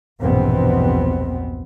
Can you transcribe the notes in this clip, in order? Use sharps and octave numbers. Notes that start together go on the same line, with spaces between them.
A#1 E2 G2 B2 B3 C4